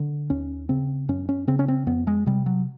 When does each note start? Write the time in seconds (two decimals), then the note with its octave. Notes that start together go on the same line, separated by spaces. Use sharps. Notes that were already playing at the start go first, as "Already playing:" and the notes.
Already playing: D3
0.30 D#2 C#4
0.69 C#3 C4
1.09 F#2 C#4
1.29 C#4
1.47 C#3 C4
1.59 C#4
1.68 C4
1.87 F2 B3
2.07 G#3
2.26 C3 G3
2.46 F#3